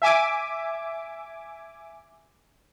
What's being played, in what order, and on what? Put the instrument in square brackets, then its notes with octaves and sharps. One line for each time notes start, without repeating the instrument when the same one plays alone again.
[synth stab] E5 G#5 D6